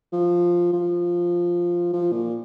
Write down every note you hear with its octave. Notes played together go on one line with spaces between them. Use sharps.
F3
F3
F3
A#2